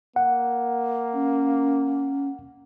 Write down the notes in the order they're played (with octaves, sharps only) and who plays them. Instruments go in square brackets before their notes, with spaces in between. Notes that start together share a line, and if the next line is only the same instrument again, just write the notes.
[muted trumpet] A#3 [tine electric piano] F#5
[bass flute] C#4